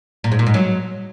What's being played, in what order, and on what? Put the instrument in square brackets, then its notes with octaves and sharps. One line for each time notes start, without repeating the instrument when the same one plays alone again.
[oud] A#2
G#2
A#2
G#2
F#3